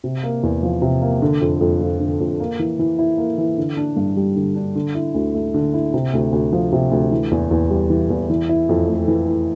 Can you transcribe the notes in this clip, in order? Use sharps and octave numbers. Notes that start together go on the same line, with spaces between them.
C3
A#3
E2
F3
C3
A#3
D3
F2
F2
F3
D3
F2
A#3
E3
E3
E4
A#3
E3
D3
D4
G2
G3
D3
D4
D3
E4
D2
A3
D3
E4
C3
D2
D2
F3
C3
D2
E3
E2
E2
G3
E3
E2
E3
E4
F2
A3
E3
E4